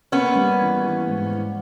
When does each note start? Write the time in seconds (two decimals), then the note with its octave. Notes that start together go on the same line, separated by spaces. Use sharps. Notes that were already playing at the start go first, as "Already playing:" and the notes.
0.12 A#3 B3 C#4
0.36 G3
0.60 E3
0.83 E3
1.07 G#2
1.31 E3